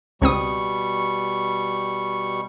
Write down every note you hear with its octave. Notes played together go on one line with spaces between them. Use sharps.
C#2 B2 G3 C4 C#6 D#6